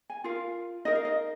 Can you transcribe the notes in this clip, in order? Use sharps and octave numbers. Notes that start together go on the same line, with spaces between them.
G#5
F4 A#4 F5
D#4 A#4 D#5
F5
D#5